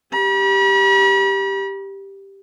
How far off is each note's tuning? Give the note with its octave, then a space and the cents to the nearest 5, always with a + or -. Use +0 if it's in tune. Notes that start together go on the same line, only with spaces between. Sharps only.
G4 +0 B5 -45